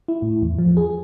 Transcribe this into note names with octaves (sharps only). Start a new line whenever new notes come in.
E4
A2
E2
F3
G#4